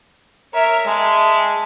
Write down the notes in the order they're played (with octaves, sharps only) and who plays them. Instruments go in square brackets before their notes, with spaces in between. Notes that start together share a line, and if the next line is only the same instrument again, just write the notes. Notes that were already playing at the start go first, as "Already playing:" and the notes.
[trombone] A#4 [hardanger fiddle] C#5 E5
[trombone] G#3 [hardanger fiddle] E5 A5